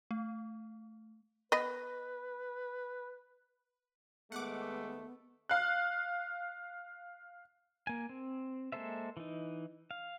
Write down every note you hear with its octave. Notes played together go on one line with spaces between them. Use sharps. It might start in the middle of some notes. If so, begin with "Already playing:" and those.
A3
B3 B4 D#5
D#2 D#3 G#3 A3 B3 F#5 D6
F5 F#6
A#3 G#5
C4
G#3 A#3 A4 C5 E5
E3 D#4
F5